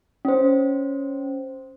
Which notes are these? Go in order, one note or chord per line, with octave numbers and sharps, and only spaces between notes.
C#4 C5